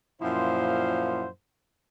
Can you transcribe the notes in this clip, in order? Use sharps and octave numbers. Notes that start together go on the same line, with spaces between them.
F#2 A#2 F3 E4 C5 F5